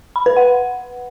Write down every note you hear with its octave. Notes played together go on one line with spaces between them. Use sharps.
B5
B4
F#5